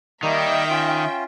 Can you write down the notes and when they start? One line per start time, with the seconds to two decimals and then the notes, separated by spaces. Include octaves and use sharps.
0.23 D#3 G3 A#3 D#4 E5 G5
0.70 C#4 F4